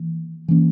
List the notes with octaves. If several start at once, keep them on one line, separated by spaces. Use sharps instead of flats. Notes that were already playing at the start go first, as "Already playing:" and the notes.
Already playing: E3 A#3
E3 A#3 C#4